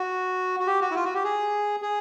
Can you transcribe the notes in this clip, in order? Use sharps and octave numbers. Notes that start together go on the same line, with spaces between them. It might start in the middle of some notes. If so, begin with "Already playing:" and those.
Already playing: F#4
F#4
G4
F#4
E4
F4
F#4
G4
G#4
G#4